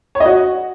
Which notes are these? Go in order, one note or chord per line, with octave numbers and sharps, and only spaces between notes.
C#5
D#5
F#4